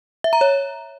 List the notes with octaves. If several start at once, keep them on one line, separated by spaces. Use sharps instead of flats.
E5
A#5
C#5